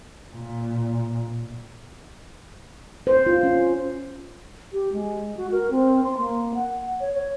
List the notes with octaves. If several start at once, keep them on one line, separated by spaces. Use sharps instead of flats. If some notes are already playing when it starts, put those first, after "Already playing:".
A#2
C5
F4
C#4
G4
G#3
F#4
A#4
C4
C6
A#3
F#5
C#5
C#5